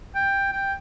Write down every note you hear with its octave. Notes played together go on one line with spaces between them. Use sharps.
G5
G5